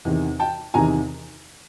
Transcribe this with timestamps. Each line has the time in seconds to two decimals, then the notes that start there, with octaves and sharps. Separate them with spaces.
0.05 E2 C3 D#3
0.39 G5 A5
0.74 E2 C3 D#3 G#5 A#5